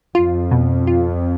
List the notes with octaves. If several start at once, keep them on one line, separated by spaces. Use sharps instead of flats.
F2 F4
B2
F4